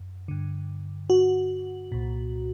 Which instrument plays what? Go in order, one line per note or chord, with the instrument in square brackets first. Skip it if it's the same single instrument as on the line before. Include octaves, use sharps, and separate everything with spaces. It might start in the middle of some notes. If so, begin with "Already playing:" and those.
Already playing: [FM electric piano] F#2
G2 D3
F#4
C2 A#2